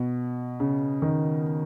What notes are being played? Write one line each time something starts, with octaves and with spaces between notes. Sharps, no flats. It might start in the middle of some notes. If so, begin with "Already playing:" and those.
Already playing: B2
C#3
D#3